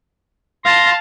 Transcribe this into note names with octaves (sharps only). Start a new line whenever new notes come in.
F5 A5 C6 A#6